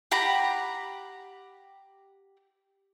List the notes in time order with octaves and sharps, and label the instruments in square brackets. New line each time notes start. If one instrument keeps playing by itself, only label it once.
[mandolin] G4 F#5 A#5 B5